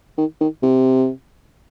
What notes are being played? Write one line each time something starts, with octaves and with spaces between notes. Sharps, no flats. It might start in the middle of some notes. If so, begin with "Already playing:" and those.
D#3
D#3
C3